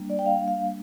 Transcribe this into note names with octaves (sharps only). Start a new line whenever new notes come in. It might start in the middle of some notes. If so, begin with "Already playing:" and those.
Already playing: G3 A#3 D4
D5
G5
F5
F5